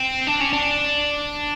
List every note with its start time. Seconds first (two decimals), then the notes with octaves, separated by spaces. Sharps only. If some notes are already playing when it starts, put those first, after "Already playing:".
Already playing: C4
0.27 D4
0.41 C#4
0.53 D4